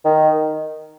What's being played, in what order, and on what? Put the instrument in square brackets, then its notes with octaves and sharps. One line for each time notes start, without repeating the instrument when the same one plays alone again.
[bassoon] D#3